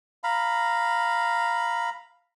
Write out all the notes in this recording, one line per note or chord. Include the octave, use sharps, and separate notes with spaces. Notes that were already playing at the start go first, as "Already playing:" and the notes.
F5 A#5 B5